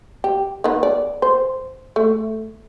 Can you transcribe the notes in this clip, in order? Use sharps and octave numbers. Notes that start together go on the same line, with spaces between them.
G4
D#3 B3
D5
C5
A3